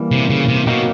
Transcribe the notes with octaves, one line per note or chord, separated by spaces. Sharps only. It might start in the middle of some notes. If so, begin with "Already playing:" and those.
Already playing: E3 G3 A#3
C3
C#3
C3
B2 F#3 A#3 D#4 G4